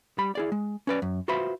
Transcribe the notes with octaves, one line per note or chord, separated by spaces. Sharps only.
G3 B5
E4 G#4 D5
G#3
C#4 B4 D5
F#2
F4 F#4 B4 C5 E5 B5